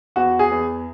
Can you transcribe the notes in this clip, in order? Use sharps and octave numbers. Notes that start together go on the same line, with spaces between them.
E2 F#4
G#4
E2